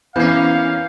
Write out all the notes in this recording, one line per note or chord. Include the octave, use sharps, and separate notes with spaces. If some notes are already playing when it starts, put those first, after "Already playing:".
E3 A#3 B3 C#4 F5 G6 C7